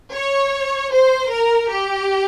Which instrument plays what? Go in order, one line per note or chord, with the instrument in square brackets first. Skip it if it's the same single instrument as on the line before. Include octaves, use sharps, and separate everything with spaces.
[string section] C#5
C5
A#4
G4